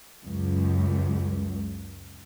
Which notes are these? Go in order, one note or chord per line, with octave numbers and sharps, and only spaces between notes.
C#2 F#2